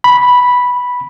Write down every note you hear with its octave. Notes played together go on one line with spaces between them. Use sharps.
B5